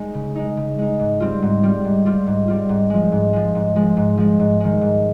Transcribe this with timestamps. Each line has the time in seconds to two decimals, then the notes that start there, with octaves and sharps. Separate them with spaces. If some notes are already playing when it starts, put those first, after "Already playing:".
Already playing: G#3 D#4
0.14 C#3
0.35 G#3 D#4
0.57 C#3
0.78 G#3 D#4
1.00 G#2
1.20 G3 C4 F4
1.42 G#2
1.63 G3 C4 F4
1.85 G#2
2.05 G3 C4 F4
2.27 G#2
2.48 G3 C4 F4
2.69 G#2
2.90 F3 G#3
3.12 G#2
3.33 F3 G#3
3.55 G#2
3.76 F3 G#3
3.97 G#2
4.18 F3 G#3
4.40 G#2
4.60 D#3 G#3
4.81 G#2